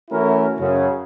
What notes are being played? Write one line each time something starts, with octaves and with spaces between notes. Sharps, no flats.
E3 A3 C#4 E4 F#4 A#4
F#2 C#3